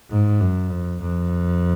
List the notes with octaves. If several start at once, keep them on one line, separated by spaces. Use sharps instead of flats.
G#2
F#2
F2
F2